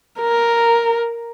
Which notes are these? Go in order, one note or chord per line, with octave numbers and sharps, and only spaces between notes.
A#4